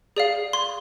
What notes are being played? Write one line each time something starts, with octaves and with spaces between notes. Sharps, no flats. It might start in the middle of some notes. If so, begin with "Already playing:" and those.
G#4 D5 F5
C6